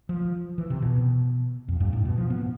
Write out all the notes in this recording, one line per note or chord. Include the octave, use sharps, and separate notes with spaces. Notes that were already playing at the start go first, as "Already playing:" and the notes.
F3
E3
C3
B2
F2
G2
A2
B2
F3
B3